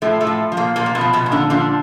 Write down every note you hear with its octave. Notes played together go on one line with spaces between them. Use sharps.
A2 F3 A3
A2 A3
F3
F3
A#2 A#3
A#2 F3 A#3
A#3
B2 B3
F3
B2 B3
A#2
D3 D4
D3 F3 D4